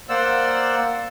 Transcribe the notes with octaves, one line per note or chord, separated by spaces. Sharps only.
A#3 C5 D5 F#5 E6